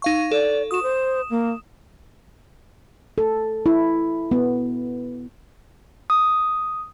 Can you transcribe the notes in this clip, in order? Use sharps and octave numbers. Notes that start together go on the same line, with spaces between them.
D#4 F5 C#6
A4 D5
F#4 D#6 E7
C5
A#3
A4
E4
B3
D#6